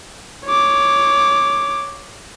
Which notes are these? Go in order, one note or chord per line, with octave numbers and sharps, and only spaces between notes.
C#5 D6